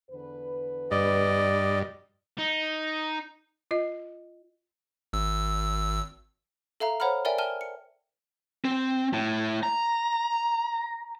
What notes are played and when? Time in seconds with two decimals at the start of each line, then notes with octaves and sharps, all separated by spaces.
0.11 E2 D3 B4
0.91 G2 D5 D#5
2.38 D#4
3.71 F4 D#5
5.13 G#1 E6
6.80 A4 E5 F5 A#5
7.00 C5 C#5 F#5 A#5 B5 F6
7.25 A#4 D5 E5 G5 G#5
7.38 G5 A5 F6 D#7 G7
7.61 C#7
8.65 C4
9.13 A2
9.63 A#5